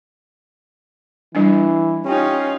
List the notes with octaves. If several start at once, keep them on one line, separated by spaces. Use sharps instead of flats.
E3 G3 D4
C#4 D#4 F4 G4